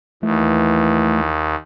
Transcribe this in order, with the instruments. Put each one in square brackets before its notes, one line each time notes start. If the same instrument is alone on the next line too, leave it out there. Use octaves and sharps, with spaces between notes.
[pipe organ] D#2 [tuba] E3 [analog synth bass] A3